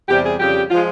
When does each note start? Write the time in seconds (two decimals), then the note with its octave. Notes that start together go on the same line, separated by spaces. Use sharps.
0.09 E2 C3 G3 G4
0.24 G#4
0.40 F2 C#3 G3 G4
0.71 F3 G#3 F4